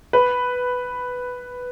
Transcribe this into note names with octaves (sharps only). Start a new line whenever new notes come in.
B4